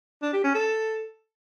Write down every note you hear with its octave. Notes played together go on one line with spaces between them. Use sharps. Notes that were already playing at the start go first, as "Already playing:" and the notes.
D4
G4
C#4
A4